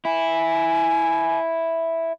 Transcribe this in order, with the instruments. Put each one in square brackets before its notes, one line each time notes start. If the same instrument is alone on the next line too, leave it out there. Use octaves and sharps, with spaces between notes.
[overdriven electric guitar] E4 [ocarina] G#5